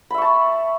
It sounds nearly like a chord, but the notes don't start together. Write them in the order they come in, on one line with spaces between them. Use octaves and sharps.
B5 E5 C#6 A5